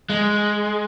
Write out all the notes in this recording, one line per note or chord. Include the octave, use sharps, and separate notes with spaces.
G#3